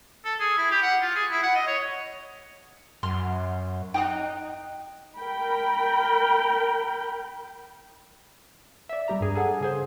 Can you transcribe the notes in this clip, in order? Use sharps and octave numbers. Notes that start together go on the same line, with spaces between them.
A4
G#4
E4
G4
F#5
F4
G#4
E4
F#5
D#5
C#5
F#2 C6 F6
D#4 G5 D#6 F#6
A#4 G5 B5
D5 E5
G3 G4 A#5
G2 G#4
G#4 A4 F#5 G#5
C#3 G#4 C5